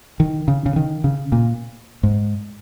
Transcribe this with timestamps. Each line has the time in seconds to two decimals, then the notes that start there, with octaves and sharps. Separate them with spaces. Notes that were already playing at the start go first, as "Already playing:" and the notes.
0.20 D#3
0.48 C#3
0.66 C#3
0.76 D#3
1.04 C#3
1.32 A#2
2.03 G#2